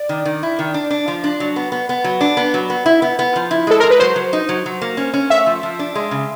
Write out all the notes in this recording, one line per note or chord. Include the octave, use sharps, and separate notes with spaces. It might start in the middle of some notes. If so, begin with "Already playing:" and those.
Already playing: D5
D#3
D#3
E4
D#3
D4
D4
F3
D4
F#3
B3
B3
B3
F#3
D4
B3
F#3
B3
E4
B3
B3
F3
E4
G#3 A4
G#3 A#4
B4
F#3 C5
F#3
D#4
F#3
F#3
A#3
C#4
C#4
A3 E5
F3
F3
D4
G#3
C#3